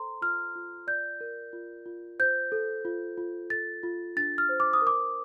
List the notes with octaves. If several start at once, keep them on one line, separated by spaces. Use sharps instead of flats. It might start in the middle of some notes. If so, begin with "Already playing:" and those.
Already playing: A4 C5 A#5 C6
F4 F6
F4
D5 G6
A#4
F4
F4
C5 G6
A4
F4
F4
A4 A6
F4
D4 A6
F6
C5
D6
D#6
A#4 D6